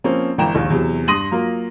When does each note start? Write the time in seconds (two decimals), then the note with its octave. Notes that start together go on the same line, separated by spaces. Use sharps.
0.04 F3 A#3 C4 C#4
0.38 G1 E3 G5 A#5 E7
0.55 A#1 D#2
0.70 E2 C3 F#3
1.08 G2 C6 D#6 A#6 D#7 F#7
1.31 F#3 A#3 F4